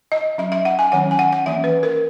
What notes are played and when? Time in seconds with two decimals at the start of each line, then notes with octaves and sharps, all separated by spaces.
0.12 D#5
0.38 F#3 C#4 E5
0.52 E5
0.65 F#5
0.79 G#5
0.92 D#3 F#3 C#4 F#5
1.11 G#5
1.19 F#5
1.33 F#5
1.46 E3 A#3 C#4 E5
1.64 B4
1.83 A#4